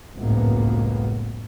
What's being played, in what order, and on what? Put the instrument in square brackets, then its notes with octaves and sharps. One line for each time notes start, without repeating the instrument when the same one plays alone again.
[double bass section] G#1 C#2 F#2 A2 A#3 B3